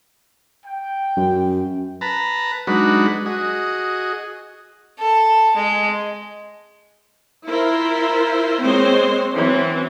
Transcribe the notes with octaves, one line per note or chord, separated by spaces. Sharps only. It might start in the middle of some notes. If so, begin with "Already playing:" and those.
G5
F#2
B4 A5 A#5
F#3 G#3 D4 D#4 F#4 B4
F#4 G#4 D#5
A4
G#3
E4 F4 A#4 C5
G#3 A#3 C4 C5 C#5
E3 F#3 C4 C#4